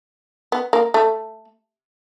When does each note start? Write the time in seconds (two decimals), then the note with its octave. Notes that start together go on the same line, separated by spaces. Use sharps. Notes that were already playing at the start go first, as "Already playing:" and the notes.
0.52 B3
0.73 A#3
0.94 A3